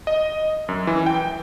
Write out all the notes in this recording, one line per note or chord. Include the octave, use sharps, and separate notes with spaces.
D#5
F#2
E3
G5